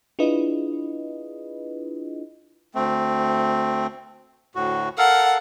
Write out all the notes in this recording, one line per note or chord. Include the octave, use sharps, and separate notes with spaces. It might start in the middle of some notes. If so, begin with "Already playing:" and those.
D4 E4 F4 G#4 B4 D#5
D2 A3 C4
D2 A2 F#4
A4 A#4 F5 F#5